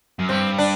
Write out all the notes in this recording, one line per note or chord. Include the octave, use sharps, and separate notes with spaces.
F#2
G2 C4
D4